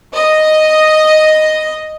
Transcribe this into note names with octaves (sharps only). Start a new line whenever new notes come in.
D#5